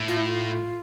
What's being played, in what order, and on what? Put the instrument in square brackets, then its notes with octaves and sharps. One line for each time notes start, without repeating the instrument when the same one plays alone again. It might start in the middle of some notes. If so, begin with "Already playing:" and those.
Already playing: [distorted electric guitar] A2
[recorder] F4
E4
F4